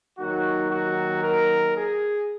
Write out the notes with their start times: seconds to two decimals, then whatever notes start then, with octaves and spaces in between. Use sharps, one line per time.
0.18 D#2 D#3 F#3 F#4
0.71 F#4
1.23 A#4
1.76 G#4